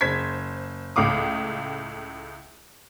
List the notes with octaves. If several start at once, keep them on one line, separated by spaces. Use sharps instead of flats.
F#1 C5 G#6 B6
C#2 A2 F5 D6 D#6